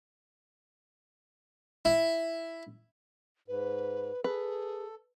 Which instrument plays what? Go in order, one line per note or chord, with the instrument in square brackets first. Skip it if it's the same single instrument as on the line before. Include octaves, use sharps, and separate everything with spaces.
[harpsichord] E4
[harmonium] G#2 [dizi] B4
[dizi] G#4 [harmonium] A4 [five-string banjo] B4